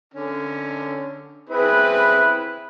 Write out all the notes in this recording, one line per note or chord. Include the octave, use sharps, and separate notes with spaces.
D3 C#4
C4 E4 G#4 B4